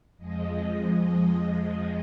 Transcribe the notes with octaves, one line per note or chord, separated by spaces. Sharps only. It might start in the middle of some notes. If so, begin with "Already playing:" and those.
F2 F3 G#3 D#5